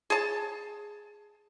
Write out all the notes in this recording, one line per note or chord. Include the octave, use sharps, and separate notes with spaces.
G#4 A5